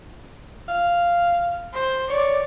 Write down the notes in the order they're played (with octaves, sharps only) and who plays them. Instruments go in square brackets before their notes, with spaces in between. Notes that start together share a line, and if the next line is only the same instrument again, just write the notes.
[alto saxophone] F5
[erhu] C5
[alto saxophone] C#5 [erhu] D5